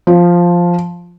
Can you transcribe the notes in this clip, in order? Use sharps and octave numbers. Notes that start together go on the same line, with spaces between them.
F3